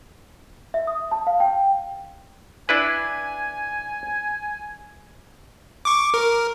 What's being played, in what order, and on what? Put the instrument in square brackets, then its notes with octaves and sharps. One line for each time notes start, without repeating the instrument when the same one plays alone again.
[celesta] E5
D#6
A5
F5
G5
[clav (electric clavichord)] D4 E4 B4 [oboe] G#5
[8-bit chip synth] C#6 D6
A#4